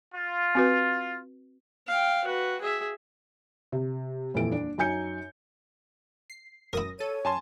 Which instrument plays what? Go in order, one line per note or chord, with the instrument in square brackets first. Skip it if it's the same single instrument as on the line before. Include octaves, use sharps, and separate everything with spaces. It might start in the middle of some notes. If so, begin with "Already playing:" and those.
[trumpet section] F4
[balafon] C4 F#4 B4
[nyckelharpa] F5 G5
F#4 B4
G#4 E5
[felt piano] C3
D#1 F2 A#2 E3 A4 D7
D4
F#2 D#4 G#5 G6 C#7
[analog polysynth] C7
[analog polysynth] F#2 D#6 A#6 [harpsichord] E4 A#4
[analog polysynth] A4 D#7 [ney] C#5
[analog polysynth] F#2 [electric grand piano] G#5 A5 C6